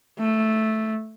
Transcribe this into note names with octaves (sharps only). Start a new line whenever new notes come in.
A3